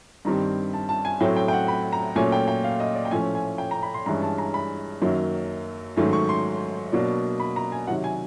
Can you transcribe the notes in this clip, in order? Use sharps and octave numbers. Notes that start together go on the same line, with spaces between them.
G2 D#3 G3 C4 A#5
A5
A5
G#5
A2 F#3 A3 C4 G5
G5
G5
F#5
B5
A#5
A#2 F#3 A3 C#4 G#5
G5
G5
F5
D#5
D5
G5
A2 F3 A3 C#4 G#5
G#5
G5
A#5
B5
C6
G2 E3 G#3 C#4 A#5
A5
A#5
B5
F#2 D#3 F#3 A#3
G#2 D#3 F#3 A3 C#4
C#6
C6
B2 F#3 A#3 D4
B5
A#5
G#5
C3 D#3 F#3 F#5
G#5